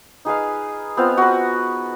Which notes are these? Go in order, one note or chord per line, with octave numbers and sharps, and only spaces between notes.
D#4 G#4 B4 F5
B3 C4 F4 F5
F#4 B4